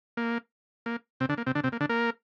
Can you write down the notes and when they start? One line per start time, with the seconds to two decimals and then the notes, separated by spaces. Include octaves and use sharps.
0.17 A#3
0.86 A#3
1.20 C3 C4
1.29 D3 D4
1.38 A#3
1.47 C3 C4
1.55 D3 D4
1.64 C3 C4
1.72 A#3
1.81 D3 D4
1.89 A#3 A#4